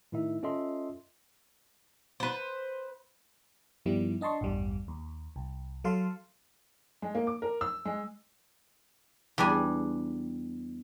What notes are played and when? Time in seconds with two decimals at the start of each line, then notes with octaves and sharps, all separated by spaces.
0.12 A2 D#3 D#4 E4 E5
0.43 C#4 F4 A4 D#5 E5 C6
2.20 B4 C5
3.86 G2 D#3 F3 G3 B3 E4
4.21 D4 D#5 A5 C6 C#6
4.41 A1 E2 G2 G3
4.88 D#2
5.36 C2
5.84 F#3 A4 F5 A5 C6
7.02 G#3
7.15 A#3
7.27 D6
7.42 A#4
7.61 E6
7.85 G#3
9.38 E2 G3 D4 G#5